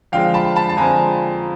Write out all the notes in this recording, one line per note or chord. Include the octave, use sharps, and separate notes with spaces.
F2 D3 F3 G#3 C4 F5 G5
A5 B5
A5 B5
A5
F2 D3 F3 G#3 C4 G#5 A#5